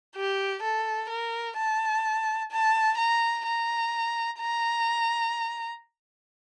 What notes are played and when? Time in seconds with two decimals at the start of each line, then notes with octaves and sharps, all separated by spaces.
0.16 G4
0.63 A4
1.10 A#4
1.58 A5
2.52 A5
2.98 A#5
3.46 A#5
4.39 A#5